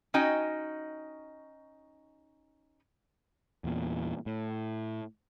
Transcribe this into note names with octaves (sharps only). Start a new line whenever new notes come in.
C#4 D#4 F#4 D#5 G5 G#5
E2 A#2
A2